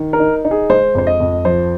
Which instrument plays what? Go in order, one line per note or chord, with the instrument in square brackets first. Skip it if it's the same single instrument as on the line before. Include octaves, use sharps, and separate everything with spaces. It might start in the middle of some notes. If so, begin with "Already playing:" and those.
Already playing: [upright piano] D#3
A#4
D#4
D#4
G#4
G#3 C5
F2 C5
D#5
F2
F3 C5